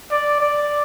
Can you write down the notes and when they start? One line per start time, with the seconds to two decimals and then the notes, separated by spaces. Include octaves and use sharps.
0.11 D5
0.41 D5